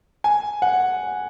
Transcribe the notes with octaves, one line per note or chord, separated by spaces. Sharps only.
G#5
F#5